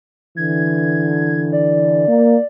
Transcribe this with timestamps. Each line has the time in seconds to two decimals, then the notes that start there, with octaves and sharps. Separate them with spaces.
0.37 D3 E3 G#6
1.53 D5
2.08 A#3